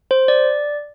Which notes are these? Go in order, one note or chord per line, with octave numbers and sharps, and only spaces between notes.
C5
D5